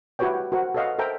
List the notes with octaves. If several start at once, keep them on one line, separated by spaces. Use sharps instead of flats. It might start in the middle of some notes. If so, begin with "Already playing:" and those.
E4 F#4 G4 B4 C#5 G5
F#4 A#4 C5 F#5
A4 B4 C#5 D#5 F5 F#5
A4 A#4 C5 E5 G5 A#5